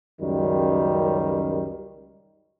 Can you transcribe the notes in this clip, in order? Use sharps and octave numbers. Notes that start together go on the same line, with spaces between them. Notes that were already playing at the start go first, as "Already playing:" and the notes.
C#2 F#2 D#3 G3